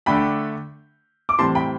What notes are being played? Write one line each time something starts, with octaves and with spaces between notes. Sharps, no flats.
D3 A3 D4 G5 B5
D6
A2 E3 G3 C4 A5 C6
G5 B5